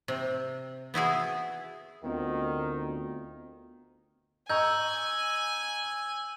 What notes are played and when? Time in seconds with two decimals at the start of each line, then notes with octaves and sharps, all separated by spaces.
0.08 C3
0.94 B3 E4 F#4 G#4
2.04 D2 D#3 B3 C4 F4
4.50 D#5 G#5 A#5 C#6 E6 G6 G#6